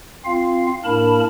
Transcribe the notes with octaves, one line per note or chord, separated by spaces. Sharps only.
C4 F4 F5
A2 A#3 D4 A#4 A5 B5